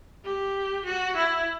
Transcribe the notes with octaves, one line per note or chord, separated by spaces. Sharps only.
G4
F#4
E4